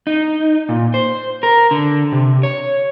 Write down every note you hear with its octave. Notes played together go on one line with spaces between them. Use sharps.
D#4
A#2
C5
A#4
D3
C3
C#5